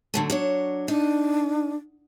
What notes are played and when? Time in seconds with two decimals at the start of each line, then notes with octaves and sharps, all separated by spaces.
0.14 D3 F#3 A3
0.30 F#3 D4 C#5
0.88 D4 D#4